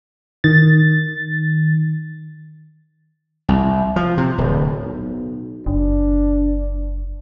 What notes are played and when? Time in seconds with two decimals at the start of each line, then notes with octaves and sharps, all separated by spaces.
0.44 D#3 A6
3.49 C2
3.96 F3
4.17 C3
4.38 D1
4.85 B1
5.66 F#1 D4